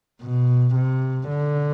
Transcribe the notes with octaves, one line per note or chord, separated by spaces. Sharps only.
B2
C3
D3